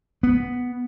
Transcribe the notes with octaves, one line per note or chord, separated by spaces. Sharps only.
B3